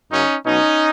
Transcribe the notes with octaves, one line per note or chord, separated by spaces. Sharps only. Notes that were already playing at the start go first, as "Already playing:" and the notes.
F#2 C#3 F#3 C#4 D#4
B2 F#3 C#4 D#4